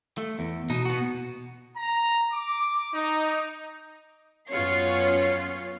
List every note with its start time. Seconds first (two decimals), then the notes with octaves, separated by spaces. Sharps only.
0.18 A3
0.39 E2
0.70 B2 D#4
0.85 B3 F#4
1.77 A#5
2.32 D6
2.93 D#4
4.49 F#2 B3 C#4 F4 C#5 C7